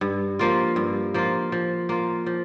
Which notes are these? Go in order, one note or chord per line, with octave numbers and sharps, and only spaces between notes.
G2
F3 A#3 F4
G2
F3 A#3 F4
F3
A#3 F4
F3